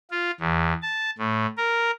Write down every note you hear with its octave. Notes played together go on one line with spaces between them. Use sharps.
F4
E2
A5
A2
A#4